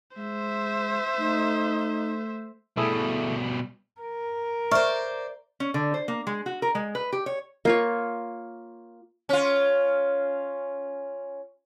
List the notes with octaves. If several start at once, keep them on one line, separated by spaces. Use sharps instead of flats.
G#3 C5 E5
A3 D#4
B2 G3 A3 E4 G#4
A#4
C5 D5 E5 C#6 F6
C#4
D3
C5
A#3
G#3
F#4
A#4
G#3
B4
G4
C#5
A#3 F4 C#5
C#4 F4